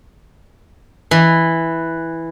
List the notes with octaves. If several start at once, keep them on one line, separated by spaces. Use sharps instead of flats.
E3